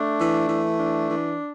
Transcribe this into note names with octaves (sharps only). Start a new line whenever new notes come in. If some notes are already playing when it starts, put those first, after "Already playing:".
Already playing: A3 D4
E3
E3
D4
E3